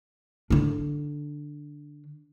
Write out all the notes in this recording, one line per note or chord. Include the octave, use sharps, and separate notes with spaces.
D3 D4